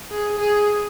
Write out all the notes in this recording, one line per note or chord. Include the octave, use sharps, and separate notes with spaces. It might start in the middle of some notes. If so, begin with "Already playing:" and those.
G#4
G#4